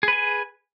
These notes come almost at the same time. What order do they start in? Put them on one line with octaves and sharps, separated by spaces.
G#4 B4 G#5